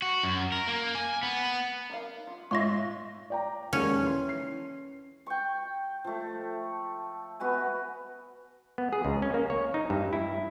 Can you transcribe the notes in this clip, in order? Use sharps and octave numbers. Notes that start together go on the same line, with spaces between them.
F#4
F#2
A#4
A#3
G#5
B3
D#4 A#4 F5
F4
G#2 F4 C#5 D#5 E5 C6 C#6 A#6
D5 G5 A#5
D#2 G#3 C#4 A#4
E3 C6
C7
G5 C#6
F3 A3
B3 F#4 B4 G#5
B3
G#4
C#2
C#4
A#3
C#5
D#4
G2
E4